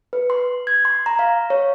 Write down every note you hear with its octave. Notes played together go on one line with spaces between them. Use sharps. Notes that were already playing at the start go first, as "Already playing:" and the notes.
B4
C6
G#6
C6
A#5
F5
C#5